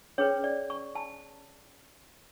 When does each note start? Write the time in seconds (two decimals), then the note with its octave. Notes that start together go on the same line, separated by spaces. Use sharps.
0.18 C#4 G#4 B4 C#5
0.44 D5
0.70 C#6
0.95 A5